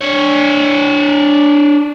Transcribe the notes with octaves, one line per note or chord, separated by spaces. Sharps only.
D4 C#5